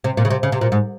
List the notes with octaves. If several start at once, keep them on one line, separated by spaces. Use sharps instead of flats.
C3
A#2
C#3
C3
C#3
C3
A#2
G#2